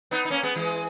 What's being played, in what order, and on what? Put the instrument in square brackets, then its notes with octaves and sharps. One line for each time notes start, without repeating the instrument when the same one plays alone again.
[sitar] B3 D#4
D#4
A#3 C#4
G#3 B3
E3 G#3